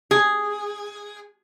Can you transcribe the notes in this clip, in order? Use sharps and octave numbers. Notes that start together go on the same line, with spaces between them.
G#4